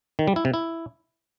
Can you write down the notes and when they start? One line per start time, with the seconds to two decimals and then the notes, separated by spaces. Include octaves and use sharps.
0.19 D#3
0.28 G3
0.36 E4
0.45 C3
0.54 E4